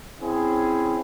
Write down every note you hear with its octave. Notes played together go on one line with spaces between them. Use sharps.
C4 C#4 E4 G#4